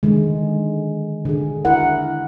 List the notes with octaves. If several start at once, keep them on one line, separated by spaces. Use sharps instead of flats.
D3 D#3 G#3
D3 G#4
E4 A#4 F#5